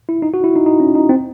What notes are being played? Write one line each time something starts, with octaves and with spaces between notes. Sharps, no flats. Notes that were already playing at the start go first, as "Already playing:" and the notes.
E4
D#4
F#4
E4
D#4
D#4
C#4
D#4
C4